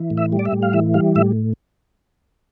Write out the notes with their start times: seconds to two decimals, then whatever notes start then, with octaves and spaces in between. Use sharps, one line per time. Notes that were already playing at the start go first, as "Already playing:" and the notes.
Already playing: E3
0.10 A2
0.18 E5
0.32 G3
0.39 D5
0.45 E5
0.52 A2
0.62 F5
0.73 E3 E5
0.94 G3 F5
1.15 A2 E5